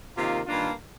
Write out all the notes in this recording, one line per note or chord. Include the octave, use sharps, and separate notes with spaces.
C3 D#3 A#3 F4
G2 D#3 A#3 D4 F4